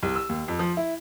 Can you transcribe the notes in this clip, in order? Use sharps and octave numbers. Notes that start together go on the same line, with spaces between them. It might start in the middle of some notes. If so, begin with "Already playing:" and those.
C2
E6
D#2
F2
F3
E4